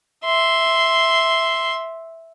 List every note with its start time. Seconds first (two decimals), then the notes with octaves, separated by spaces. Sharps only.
0.25 E5 C6